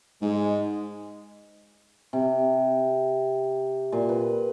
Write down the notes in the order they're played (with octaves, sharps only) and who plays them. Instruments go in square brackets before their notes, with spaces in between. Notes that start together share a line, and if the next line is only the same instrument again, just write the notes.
[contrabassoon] G#2 [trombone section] G#3
[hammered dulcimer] C3
A#2
B4